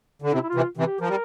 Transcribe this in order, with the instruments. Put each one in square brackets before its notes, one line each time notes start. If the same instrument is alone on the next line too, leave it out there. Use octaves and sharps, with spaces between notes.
[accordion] D3
[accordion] C3 [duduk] E4
[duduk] E4
F4
[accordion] C3 E3
C3 E3
[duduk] G4
[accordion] F3 [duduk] A#4
[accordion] G3